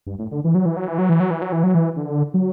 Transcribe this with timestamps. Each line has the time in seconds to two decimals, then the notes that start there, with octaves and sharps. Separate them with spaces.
0.07 G2
0.19 A2
0.31 D3
0.44 E3
0.55 F#3
0.66 E3
0.77 F#3
0.88 E3
0.98 F#3
1.09 E3
1.20 F#3
1.31 E3
1.42 F#3
1.52 E3
1.64 F#3
1.75 E3
1.96 D3
2.34 F#3